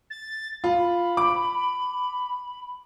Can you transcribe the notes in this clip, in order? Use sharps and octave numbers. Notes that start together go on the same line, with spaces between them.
A6
F4 B5
D6